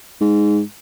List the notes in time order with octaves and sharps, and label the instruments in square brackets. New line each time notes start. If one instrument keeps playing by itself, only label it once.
[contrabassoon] G#2